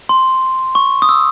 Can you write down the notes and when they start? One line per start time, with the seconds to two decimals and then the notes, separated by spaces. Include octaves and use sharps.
0.09 C6
0.75 C#6
1.02 D#6
1.09 E6